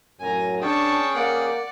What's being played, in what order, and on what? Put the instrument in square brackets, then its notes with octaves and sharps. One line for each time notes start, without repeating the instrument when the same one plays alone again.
[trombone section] F#2 A2 F#3 [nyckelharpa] G#5 A#5
[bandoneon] C#4 G#4 G5 [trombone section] D4 [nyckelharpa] A5 C#6
[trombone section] A#3 [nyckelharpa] D5 F#5